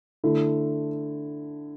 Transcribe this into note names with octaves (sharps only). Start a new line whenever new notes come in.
D3 A3 E4